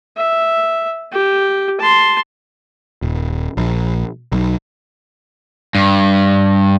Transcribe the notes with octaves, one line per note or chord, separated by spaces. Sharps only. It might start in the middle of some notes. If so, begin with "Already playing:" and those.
E5
G4
A5 C6
D#1
A#1
B1
G2